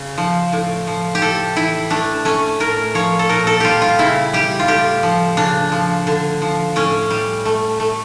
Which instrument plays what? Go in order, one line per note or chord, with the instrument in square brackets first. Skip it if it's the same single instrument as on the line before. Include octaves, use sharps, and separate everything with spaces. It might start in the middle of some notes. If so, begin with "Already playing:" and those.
Already playing: [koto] C#3
F3
A2
F3
G4
A2 A4
E3 E4
A3 D4
A3 C#4
A2 A#4
F3 C#5
A4
A#2 A#4
A4
G3 F4 G4
F4
C#3 E4
G3 G4
F4
A2 G4
F3
C#3 D4
F3
D3
F3
A2 C#4
G3
A3
A3